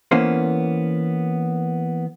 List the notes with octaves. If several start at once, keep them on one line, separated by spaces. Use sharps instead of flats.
E3 A#3 B3 C#4 C5